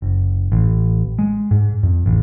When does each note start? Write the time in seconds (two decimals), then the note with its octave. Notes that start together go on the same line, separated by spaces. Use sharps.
0.02 F#1
0.52 A1
1.19 G#3
1.51 G#2
1.83 F2
2.06 A1